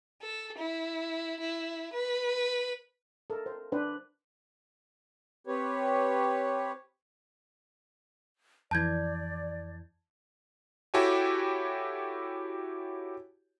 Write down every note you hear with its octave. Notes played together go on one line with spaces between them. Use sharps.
A4
E4
E4
B4
A4 A#4
C5
D4 B4 C5 D5
C4 G4 B4 C#5
F2 E3 D5 A5 G6 G#6
E4 F#4 G4 A4 C#5 G#5